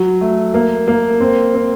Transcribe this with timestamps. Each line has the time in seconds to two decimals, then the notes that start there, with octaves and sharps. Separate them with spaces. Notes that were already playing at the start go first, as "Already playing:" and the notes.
Already playing: F#3 F#4
0.21 A3
0.54 A#3
0.88 A#3
1.20 C4
1.54 C4